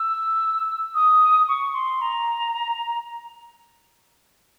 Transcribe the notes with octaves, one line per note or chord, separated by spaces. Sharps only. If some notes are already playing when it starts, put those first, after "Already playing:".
Already playing: E6
D#6
C#6
C6
A#5